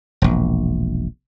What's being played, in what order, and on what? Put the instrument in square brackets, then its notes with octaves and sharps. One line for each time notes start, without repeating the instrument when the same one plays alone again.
[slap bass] E1 A#1